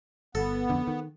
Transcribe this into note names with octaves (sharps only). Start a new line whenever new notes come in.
G1 B3 A4
F2 D3
D#3